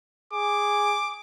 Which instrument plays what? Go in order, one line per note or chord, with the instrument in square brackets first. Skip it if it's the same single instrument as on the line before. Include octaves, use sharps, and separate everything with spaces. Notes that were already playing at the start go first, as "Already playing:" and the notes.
[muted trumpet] G#4 [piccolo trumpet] D6